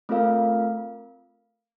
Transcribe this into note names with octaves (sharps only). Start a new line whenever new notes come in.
A3 C4 F4 A#4 F5